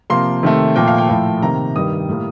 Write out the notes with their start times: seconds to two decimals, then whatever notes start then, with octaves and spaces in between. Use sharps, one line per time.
0.10 C3 F3 A#3 C6
0.43 C3 D#3 A3
0.76 A#2 F3 A3 G5
0.88 F5
0.98 G5
1.09 A2 F3 A3
1.42 C3 D#3 A#3 A#5
1.76 G2 D#3 G3 D#6
2.09 A2 G3 A#3